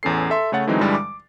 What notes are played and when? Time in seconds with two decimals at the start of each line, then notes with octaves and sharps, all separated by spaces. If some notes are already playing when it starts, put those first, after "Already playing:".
0.03 A1 E2 C#4 A4 C7
0.30 A4 E5 C6
0.52 C#3 A3 C#5 F#5 A6
0.67 D3 E3 F#3 G#3 C4 D#4
0.81 G2 D3 E3 G3 G#3
0.95 D6